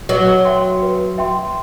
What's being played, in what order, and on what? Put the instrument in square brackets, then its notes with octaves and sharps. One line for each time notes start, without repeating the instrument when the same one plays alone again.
[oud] F#3 [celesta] B4
[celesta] E5 G5 C6
B4
E5 G5 C6